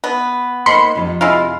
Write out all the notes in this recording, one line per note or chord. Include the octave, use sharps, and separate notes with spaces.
B3
A#3 D#4 C5 B5 C6 C#7
F2 C3
G#3 E4 F4